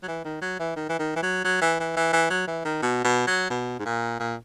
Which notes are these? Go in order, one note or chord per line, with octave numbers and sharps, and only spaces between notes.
F#3
E3
D#3
F#3
E3
D#3
E3
D#3
E3
F#3
F#3
E3
E3
E3
E3
F#3
E3
D#3
B2
B2
F#3
B2
G#2
A#2
A#2